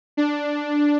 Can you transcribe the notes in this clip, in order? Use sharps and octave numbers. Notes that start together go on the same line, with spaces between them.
D4